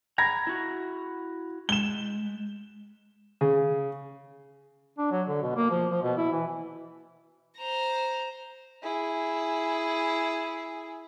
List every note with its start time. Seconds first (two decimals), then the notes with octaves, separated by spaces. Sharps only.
0.18 A#5 B5 G#6 A#6
0.47 E4 F#4
1.69 G#3 E7 G7
3.41 C#3
4.98 D4
5.11 F#3
5.28 D3
5.42 B2
5.56 A#3
5.71 F3
5.91 F3
6.03 B2
6.17 E4
6.33 E3
7.58 C5 A#5
8.83 E4 G#4